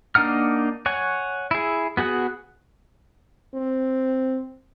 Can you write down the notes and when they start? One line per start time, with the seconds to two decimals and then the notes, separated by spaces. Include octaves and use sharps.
0.15 A#3 D4 D#4 F#5 F6
0.86 C#5 F#5 G#5
1.51 E4 G#4
1.97 B3 F#4 G#4 F#5
3.54 C4